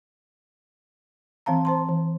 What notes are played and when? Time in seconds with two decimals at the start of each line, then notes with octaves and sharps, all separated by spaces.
1.46 E3 C4 F5 A5 A#5
1.65 C5 A5 C6
1.89 E3